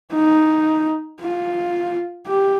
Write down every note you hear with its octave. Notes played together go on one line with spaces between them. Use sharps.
D#4
F4
G4